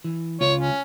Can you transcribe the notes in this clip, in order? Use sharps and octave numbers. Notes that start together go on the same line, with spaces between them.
E3
C#2 F4 C#5
C#4